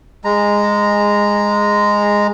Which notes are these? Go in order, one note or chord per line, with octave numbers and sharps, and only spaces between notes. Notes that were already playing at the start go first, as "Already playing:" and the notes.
G#3 A#5